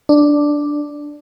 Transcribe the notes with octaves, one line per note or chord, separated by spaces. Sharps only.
D4